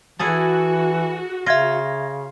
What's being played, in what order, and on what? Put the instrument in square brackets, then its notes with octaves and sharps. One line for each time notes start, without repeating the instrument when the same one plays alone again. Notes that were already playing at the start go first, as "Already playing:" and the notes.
[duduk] E3 [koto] E4 G#4 A4 [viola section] F#4
[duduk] C#3 [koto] F4 [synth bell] E5 G#6 A#6